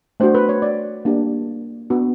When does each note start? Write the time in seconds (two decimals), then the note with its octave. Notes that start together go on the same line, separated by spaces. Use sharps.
0.20 A3 D4 F#4 C5
0.35 B4
0.49 C#5
0.62 D5
1.05 A#3 D4 G4
1.90 B3 D4 F#4